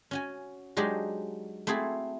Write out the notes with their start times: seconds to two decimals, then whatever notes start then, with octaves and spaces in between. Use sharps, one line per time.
0.11 C#4 F#4 G#5
0.77 F#3 G#3 D4 D#4 F#4 G4
1.67 A3 C4 E4 F#4 G#4 A4